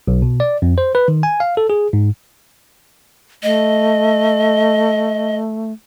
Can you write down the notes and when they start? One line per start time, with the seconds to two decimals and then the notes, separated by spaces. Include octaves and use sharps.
0.07 B1
0.22 B2
0.40 D5
0.62 F2
0.78 C5
0.95 B4
1.08 D#3
1.23 G#5
1.40 F5
1.57 A4
1.70 G#4
1.93 G#2
3.43 A3 D#5